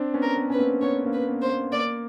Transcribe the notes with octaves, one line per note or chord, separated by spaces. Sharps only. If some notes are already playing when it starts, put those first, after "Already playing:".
Already playing: C4 D4
B3 C#4
A#4
B3
C#4 B4
A#3 C4
B3 C#4 C#5
A#3 C4
B4
B3
C5
A#3
A#3 D5